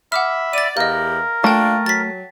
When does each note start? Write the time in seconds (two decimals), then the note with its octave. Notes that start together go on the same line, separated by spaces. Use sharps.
0.12 E5 F#5 B5 D6 F6
0.53 D5 A6 D#7
0.77 E2 B3 G4 A#4 D#5 F5
1.44 A3 A#3 D4 F4 G5 A5
1.86 F#3 A6 B6